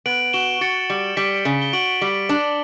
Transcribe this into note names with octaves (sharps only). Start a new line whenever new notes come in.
B3 D7 F#7
F#4 E7 G7
F#4 A6 C#7
G3
G3 B6 D7
C#3
G7
F#4 D7 F#7
G3
D4